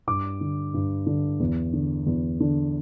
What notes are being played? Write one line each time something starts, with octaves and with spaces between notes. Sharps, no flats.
G2 D6
D3
G2
D3
E2
D3
E2
D3